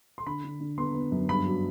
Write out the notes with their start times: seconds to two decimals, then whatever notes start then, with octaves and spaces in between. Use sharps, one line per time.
0.18 C6
0.26 D3 B5
0.44 D3
0.60 D3
0.78 B3 C6
0.95 B3
1.12 F#2
1.29 G2 B5
1.46 F#3